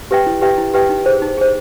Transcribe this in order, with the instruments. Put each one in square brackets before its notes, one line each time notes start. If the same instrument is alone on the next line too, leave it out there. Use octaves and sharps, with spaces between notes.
[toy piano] G4 B4 E5 G5
E4
G4 B4 E5 G5
E4
G4 B4 E5 G5
D#4
G#4 C5
D#4
G#4 C5